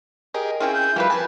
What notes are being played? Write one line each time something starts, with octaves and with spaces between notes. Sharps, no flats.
G4 G#4 A#4 D#5
C4 C#4 E4 F4 G#4 G5
G6
E3 F3 G3 E4 F4 B4
C4 B4 G#5 A5